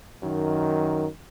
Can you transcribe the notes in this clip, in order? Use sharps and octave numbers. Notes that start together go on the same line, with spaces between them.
F#2 D#3